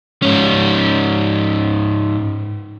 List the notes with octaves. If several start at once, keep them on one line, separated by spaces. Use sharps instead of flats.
G#2 C#4